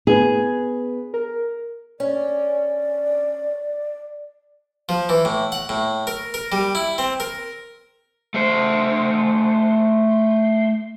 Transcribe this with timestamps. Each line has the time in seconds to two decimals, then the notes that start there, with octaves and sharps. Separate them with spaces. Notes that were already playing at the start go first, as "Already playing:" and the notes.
0.07 B3 G#4 B4
1.14 A#4
2.00 C#4 D5
4.89 F3
5.09 E3
5.25 A2
5.52 F#5
5.69 A2
6.07 A#4
6.34 A#4
6.52 G3
6.75 E4
6.98 C4
7.20 A#4
8.34 A3 C5